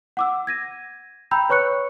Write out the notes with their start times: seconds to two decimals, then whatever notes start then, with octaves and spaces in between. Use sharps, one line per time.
0.17 F#5 D6 E6
0.47 G#6 A#6 D#7
1.31 G5 A#5 B5 E6 G6
1.49 B4 C#5 C#6 F#6 C#7